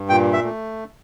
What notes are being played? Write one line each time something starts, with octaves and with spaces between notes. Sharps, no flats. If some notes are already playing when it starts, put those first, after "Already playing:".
Already playing: G2
A#2 G5
E5
A3